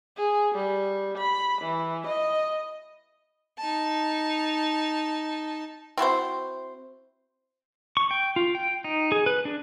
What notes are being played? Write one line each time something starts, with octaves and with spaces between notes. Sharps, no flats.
G#4
G3
B5
E3
D#5
D#4 A5
C4 E4 F#4 C5
C#6
G5
F4
G5
D#4
G#4
B4
D4